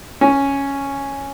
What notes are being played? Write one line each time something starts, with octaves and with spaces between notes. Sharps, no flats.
C#4